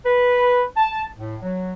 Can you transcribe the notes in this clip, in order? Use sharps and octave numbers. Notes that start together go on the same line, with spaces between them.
B4
A5
A2
F#3